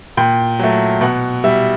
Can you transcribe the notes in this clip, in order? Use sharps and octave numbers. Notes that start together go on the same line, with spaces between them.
A#2 G5
F#3 A3
B2 F#5
G3 E5